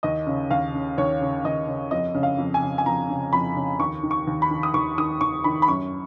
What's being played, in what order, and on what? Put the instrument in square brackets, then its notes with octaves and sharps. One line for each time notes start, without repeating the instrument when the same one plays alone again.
[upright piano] D#2 D#5
C#3
D#2 F5
C#3
D#2 C#5
C#3
D#2 D#5
C#3
F2 D#5
C#3
F5
F2
G#5
C#3
G#5
F2 A#5
C#3
F2 B5
C#3
D#2 C#6
D#3
C#6
D#2
B5
D#3
D#6
D#2 C#6
D#3 D#6
D#2 C#6
D#3 B5
B5
F#2 C#6